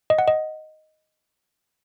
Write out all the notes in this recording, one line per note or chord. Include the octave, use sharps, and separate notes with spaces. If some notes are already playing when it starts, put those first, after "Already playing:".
D#5
F#5
D#5